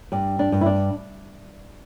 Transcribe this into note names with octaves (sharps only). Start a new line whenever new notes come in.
G2 D4
D4
G2
E4
D4